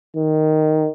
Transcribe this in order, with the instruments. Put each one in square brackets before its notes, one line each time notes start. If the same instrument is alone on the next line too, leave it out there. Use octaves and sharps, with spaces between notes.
[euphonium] D#3